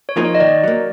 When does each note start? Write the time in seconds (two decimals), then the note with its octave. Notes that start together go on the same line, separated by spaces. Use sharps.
0.09 C#5
0.17 F3 A#3 D#4 G#4
0.25 C#5
0.35 D#5
0.40 D#3 D5
0.64 F#3 A#3